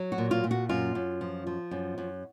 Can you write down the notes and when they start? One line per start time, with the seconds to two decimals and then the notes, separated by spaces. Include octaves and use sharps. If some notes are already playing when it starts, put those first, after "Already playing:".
Already playing: F#3
0.12 F#4
0.18 A#2
0.31 F4
0.44 A#2
0.51 F#4
0.69 F#2 F4
0.95 F#2
1.21 F3
1.47 F3
1.71 F#2
1.98 F#2